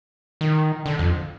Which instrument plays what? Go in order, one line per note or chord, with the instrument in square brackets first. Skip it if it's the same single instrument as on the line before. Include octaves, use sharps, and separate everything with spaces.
[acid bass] D#3
D3
F2